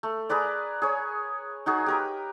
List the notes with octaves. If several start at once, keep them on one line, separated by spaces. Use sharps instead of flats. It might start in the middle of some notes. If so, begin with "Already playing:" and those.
A3
G#4 A#4 B4 D5
G#4 C#5
D#4 F#4 G#4
G4 A#4 B4